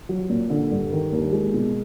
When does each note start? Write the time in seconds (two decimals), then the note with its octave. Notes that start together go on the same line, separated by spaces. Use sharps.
0.09 F#3
0.29 A#2
0.50 D3
0.71 G2
0.92 D#3
1.12 D#2
1.33 G#3
1.54 B2